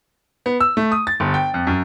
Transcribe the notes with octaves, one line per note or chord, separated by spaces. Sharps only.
B3
E6
A3
D#6
A6
G1
G5
F2
F#2